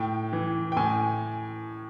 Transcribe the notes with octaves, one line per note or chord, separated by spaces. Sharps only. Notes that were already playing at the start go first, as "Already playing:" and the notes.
Already playing: A2 G5
E3
G5
A2 G#5